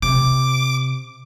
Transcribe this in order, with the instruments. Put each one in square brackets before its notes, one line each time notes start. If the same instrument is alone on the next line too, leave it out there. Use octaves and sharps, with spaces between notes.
[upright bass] C3 [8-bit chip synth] D6